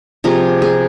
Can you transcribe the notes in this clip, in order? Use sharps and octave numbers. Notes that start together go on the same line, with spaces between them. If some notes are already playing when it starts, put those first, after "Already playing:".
C3 F3 G#4 A#5
G#4